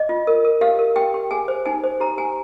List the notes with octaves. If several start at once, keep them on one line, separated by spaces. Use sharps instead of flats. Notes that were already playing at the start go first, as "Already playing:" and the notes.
Already playing: D#5
F4
A#4
A#4
G4 F5
A#4
G4 G5
G4
G#4 G#5
C5
D#4 G#5
C5
G4 A#5
G4 G#5